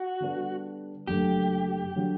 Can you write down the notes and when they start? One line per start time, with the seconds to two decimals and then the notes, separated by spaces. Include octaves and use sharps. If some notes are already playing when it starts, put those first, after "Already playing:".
Already playing: F#4
0.20 D3 G3 B3 D4 G4
1.07 F#1 F#2 D3 A3 G4
1.96 D3 F#3